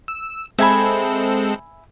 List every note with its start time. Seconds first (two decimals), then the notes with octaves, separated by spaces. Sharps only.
0.08 E6
0.59 G#3 C4 A4 E5 G#5 B5